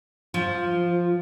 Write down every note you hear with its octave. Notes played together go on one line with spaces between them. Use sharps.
F3